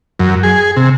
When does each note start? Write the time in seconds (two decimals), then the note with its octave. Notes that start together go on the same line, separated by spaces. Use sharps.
0.20 F#2
0.43 G#4
0.77 C3